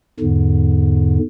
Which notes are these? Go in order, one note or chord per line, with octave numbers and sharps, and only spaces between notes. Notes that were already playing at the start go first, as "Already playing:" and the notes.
E2 G#2 D3